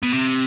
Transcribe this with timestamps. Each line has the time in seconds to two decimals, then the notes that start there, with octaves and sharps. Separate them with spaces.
0.03 B2
0.12 C3